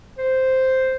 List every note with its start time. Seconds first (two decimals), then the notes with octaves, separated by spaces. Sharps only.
0.18 C5